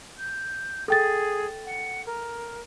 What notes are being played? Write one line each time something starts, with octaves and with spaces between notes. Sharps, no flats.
G6
G#4 A4 G5 A6
F#5
A#4